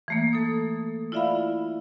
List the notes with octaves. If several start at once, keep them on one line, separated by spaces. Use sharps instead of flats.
E3 A3 A#3
A4 D#6
E4 F4 D5 E5 F5 B5